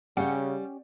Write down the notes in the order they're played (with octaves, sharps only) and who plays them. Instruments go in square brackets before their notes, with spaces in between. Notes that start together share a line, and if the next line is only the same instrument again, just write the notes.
[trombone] C#3 [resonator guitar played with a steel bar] G3 [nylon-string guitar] C#4 G4 [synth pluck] F#5